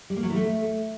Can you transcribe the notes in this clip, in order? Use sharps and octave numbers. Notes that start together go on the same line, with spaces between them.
G3
A#3
F#3
E3
A3